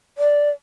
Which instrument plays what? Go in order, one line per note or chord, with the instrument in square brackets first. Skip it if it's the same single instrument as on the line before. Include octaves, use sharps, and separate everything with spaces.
[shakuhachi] D5